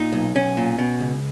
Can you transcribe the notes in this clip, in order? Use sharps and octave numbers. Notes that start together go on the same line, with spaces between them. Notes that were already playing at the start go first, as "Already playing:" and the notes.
Already playing: A#2 D#4
B1
B1 C#4
A#2
B2
C#2